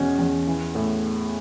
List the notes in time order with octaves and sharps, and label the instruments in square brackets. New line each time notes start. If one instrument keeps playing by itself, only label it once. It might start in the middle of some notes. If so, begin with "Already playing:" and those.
Already playing: [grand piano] E2 B2 C#4
E2
E3
A2